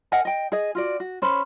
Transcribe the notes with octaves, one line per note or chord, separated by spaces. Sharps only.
A#4 D#5 F#5 G#5
D#5 G5
G#4 D#5
F4 F#4 D5
F#4
C#4 C5 C#5 B5